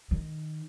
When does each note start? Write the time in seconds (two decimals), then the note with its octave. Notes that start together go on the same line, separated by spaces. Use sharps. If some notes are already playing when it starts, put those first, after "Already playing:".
0.11 D#3